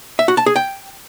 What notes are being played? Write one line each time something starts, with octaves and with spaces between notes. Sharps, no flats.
E5
F#4
A5
G#4
G5